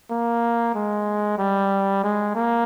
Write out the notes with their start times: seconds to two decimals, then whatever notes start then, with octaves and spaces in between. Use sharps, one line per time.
0.11 A#3
0.75 G#3
1.38 G3
2.04 G#3
2.35 A#3